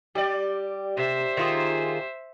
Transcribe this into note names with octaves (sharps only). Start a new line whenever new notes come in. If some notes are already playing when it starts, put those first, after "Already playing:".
G3 G4 D5
C3 C5 E5
D#3 F4 G#4